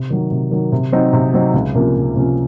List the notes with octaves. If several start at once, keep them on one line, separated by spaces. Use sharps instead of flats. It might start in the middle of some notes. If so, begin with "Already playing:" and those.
Already playing: C3
D#3 F#3
C3
D#3 F#3
C3
F#3 C4 D#4
C3
F#3 C4 D#4
C#2
C3 F3 A#3 C#4
C#2
C3 F3 A#3 C#4